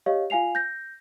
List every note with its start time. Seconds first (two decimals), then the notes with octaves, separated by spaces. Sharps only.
0.06 G4 C#5 D#5 F5
0.30 F4 F5 G#5 C7 F7
0.55 G6 A#6